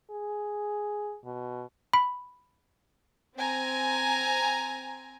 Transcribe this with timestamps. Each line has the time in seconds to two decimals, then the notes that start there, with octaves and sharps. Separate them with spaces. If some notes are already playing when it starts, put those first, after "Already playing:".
0.11 G#4
1.24 B2
1.93 B5
3.36 C4 G#5 A#5